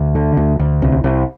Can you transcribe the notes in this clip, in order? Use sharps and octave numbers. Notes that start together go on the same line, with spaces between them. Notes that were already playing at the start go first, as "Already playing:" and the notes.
Already playing: D2
D3
D2
D2
C2
C2